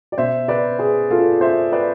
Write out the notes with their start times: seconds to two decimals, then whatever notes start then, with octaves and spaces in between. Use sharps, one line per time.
0.12 D5
0.18 B2 C5 E5
0.48 B4 D5
0.79 G#4 B4
1.11 F4 A4
1.41 C5 E5
1.72 B4 D5